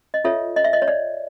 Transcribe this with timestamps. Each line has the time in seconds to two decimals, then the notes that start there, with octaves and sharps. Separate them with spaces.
0.14 D#5
0.24 F4 A4 C#5 E5
0.56 D#5
0.64 E5
0.73 D#5
0.82 C#5
0.88 D5